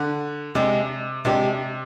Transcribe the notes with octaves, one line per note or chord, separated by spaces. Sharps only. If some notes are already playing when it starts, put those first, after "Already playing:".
Already playing: D3
C3 G#3 D4 G4
C3 G#3 D4 G4